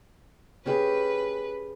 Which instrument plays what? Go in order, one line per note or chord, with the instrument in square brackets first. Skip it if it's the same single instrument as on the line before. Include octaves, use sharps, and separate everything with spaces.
[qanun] C#4 G4 G#4 [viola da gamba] B4